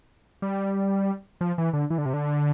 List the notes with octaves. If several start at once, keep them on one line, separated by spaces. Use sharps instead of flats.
G3
F3
E3
D3
E3
D3
C3
D3